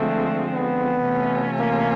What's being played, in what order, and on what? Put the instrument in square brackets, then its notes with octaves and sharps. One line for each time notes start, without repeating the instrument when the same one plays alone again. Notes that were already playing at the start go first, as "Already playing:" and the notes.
Already playing: [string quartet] D3 F3 G#3 C4 [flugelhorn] A3
[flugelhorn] B3
[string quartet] C3 E3 A3 C#4 F4
[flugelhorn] A#3